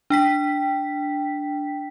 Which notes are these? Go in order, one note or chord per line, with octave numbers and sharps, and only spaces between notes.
D4 G5 B6